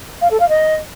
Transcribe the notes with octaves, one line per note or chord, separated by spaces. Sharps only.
F5
A4
F5
D#5